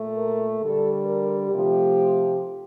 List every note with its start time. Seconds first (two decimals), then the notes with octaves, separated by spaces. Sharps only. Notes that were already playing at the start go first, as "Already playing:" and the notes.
Already playing: A#2 A3
0.17 A#4
0.61 D3 G3 A4
1.05 A#4
1.49 C3 F3 A3 G4